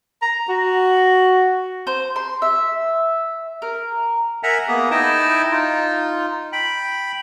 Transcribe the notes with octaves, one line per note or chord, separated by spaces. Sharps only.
A#5
F#4
C5
C6
E5
A#4
A#4 E5 F#5 G#5 A#5
A#3 B3 G#4
D#4 E4 D#5 G5 A5
D#4 F4
G5 B5